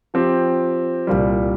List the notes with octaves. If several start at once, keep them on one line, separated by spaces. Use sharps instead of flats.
F3 C4 G4
C2 A#2 G3